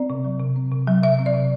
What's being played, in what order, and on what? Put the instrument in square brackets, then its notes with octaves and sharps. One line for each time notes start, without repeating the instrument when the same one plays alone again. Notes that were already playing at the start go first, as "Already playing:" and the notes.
Already playing: [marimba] C4 D5
C3
F#3
C3
C4
C3
F#3
C3 E5
C4
D5
C3